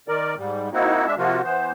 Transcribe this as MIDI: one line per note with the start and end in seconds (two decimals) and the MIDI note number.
0.08 0.35 51
0.08 0.35 70
0.08 0.35 74
0.38 0.69 44
0.38 0.69 55
0.74 1.06 58
0.74 1.06 60
0.74 1.06 63
0.74 1.06 64
0.74 1.06 66
1.06 1.15 56
1.06 1.15 62
1.06 1.15 76
1.18 1.41 48
1.18 1.41 53
1.18 1.41 58
1.18 1.41 65
1.18 1.41 66
1.44 1.72 52
1.44 1.72 59
1.44 1.72 72